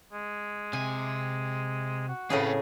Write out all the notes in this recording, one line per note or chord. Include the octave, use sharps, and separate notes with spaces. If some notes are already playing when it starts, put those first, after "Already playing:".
G#3
C3 G#5
F#4
A2 C#3 C4 G#4 B4